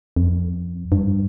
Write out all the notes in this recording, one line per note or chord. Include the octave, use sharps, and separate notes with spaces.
F2
G2